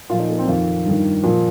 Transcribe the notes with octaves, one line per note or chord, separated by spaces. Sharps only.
A#2 F3 F4
D#4
A#3
C4
F2 D#3 F4
G2 D#3
A#2 F3